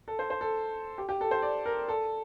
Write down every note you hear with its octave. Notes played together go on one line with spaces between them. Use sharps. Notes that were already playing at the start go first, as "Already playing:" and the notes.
A4
C5
C5
A4
G4
G4
A4
C5
D5
A#4
A4